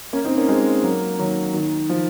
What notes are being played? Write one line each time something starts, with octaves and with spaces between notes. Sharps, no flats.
A#3 C#4
C4 D#4
A#3 C#4
G#3 C4
F#3 A#3
D#3 F#3
D#3
F3